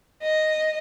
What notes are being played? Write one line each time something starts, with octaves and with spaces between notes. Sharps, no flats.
D#5